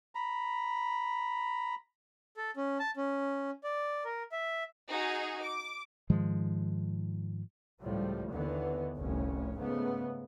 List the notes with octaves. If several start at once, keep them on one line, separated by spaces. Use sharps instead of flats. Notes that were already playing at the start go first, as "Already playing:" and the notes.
A#5 B5
A4
C#4
A5
C#4
D5
A#4
E5
D#4 F#4 G#4
D6
G#2 D#3 F3 G#3
C#2 A2 F3 G3
D#2 D3 E3 B3
F1 C2 A2 C#4
G#2 C#3 A3 B3